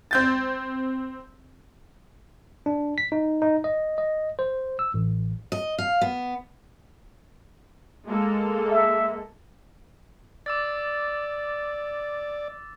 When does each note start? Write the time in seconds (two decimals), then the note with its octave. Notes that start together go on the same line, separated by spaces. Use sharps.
0.11 C4 G6 A6
2.66 D4
2.98 B6
3.12 D#4
3.42 D#4
3.64 D#5
3.98 D#5
4.39 C5
4.79 E6
4.94 A1
5.52 D#5
5.78 F5
6.01 B3
8.08 G#3 A#3 A4
8.71 E5
10.46 D5 D6 E6 A6